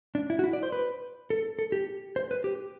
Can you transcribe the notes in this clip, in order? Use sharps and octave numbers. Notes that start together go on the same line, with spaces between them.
D4
E4
F#4
E4
D5
C5
B4
A4
A4
G4
C5
B4
G4